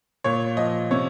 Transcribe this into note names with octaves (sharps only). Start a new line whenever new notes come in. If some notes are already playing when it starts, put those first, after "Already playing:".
A#2 C#5
F3 D#5
C3 C#5